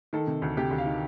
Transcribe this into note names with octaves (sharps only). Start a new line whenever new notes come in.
D#3 A4
C3
D2
C3 G4
D2
F5
D#3